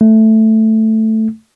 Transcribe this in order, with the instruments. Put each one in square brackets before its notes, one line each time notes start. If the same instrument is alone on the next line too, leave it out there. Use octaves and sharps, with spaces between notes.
[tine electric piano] A3